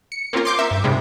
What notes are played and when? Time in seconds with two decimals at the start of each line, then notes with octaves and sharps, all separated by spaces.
0.12 C#7
0.33 A#3 C4 C#4 F4 A#4
0.45 C6 D6 G6
0.59 A#4 E5
0.71 G2
0.84 G#2 C3 G3 G#3